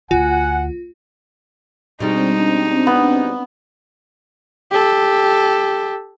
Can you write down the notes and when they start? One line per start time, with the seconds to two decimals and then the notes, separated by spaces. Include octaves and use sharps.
0.11 D2 F4 F#5 G#5
2.00 B2 G3 G#3 C4 D4 D#4
2.87 B3
4.71 G4 A4